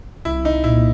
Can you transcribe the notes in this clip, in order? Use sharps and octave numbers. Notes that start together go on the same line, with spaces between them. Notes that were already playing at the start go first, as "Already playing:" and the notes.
C2 E4
D#4
A#2 E4